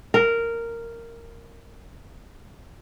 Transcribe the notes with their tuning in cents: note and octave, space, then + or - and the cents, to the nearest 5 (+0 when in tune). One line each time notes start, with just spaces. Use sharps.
A#4 -10